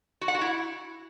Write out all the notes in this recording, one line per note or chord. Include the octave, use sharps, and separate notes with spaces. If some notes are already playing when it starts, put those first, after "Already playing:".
F#4
F#5
F#4
E4